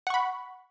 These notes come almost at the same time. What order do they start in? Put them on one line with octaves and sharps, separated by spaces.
F#5 C#6 B5